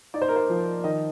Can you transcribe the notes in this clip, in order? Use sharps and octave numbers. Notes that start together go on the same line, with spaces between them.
D#4 D5
C5
A#4
C5
F3
D#3 D#5